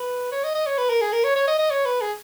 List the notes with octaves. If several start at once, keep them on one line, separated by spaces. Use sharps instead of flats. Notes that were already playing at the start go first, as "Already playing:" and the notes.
Already playing: B4
C#5
D#5
D#5
C#5
B4
A#4
G#4
A#4
C#5
C#5
D#5
D#5
C#5
B4
G#4